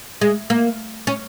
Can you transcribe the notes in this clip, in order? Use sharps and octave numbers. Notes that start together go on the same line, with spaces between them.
G#3
A#3
C#4